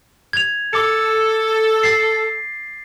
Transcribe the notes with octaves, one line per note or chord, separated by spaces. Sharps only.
G#6 F7
A4 D6 C#7
A6 C7